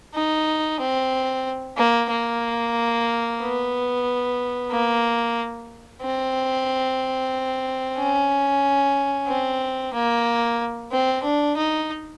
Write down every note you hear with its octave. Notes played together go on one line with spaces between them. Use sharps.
D#4
C4
A#3
A#3
B3
A#3
C4
C#4
C4
A#3
C4
D4
D#4